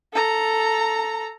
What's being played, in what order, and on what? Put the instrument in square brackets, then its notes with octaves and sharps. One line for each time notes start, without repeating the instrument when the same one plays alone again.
[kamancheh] A4 A#5